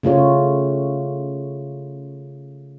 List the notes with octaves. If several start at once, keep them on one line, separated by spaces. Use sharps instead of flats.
C#3 A3 F4 C#5